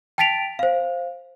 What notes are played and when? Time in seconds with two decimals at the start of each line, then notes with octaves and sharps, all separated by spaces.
0.18 G5 A5 A6 B6 D7 F7
0.59 C5 F5